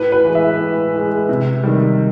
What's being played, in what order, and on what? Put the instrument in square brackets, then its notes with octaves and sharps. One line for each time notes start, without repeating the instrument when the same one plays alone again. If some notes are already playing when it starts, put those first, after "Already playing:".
Already playing: [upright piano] A2 B4
B4
E3 G#3
E5
A2
E3 G#3
C3
D#3 G3